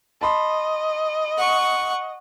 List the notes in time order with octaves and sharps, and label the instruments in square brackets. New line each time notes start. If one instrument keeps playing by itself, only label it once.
[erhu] D#5 [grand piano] A5 B5 C6
[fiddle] F#5 C#6